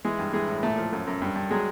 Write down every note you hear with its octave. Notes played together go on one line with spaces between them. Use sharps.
E3 G#3 G#4
G2
E3 G#3 G#4
A2
A#2 A3 A4
F3
F#2
F#2
G2
G2
F#3 G#3 G#4